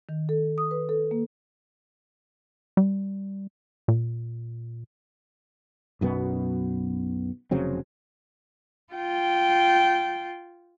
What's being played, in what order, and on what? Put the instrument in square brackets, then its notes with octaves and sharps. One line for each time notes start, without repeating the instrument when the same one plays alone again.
[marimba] D#3
A4
D#6
B4
A4
A#3
[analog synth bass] G3
A#2
[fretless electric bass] B1 F#2 B2 B3
F1 C#3 F#3 C4
[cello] F4 G5